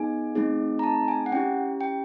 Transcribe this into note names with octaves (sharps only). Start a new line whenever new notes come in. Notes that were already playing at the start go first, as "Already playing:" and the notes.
Already playing: B3 D#4 G#4 G#5
A3 C4 D#4 G#4
A#5
A5
G#5
F#5
C#4 E4 G4 G5
G5